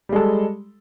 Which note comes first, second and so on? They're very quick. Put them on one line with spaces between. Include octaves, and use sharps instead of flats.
G3 G#3 A4